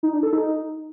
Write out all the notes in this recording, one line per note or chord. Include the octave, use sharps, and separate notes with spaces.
D#4
D4
A4
D#4